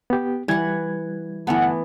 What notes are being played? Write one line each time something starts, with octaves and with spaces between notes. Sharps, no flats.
B3 G4
E3 G3 F#5 G#6
G1 E3 A3 B3 F#5 A5